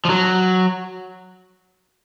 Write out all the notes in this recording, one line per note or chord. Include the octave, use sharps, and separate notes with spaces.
F3
F#3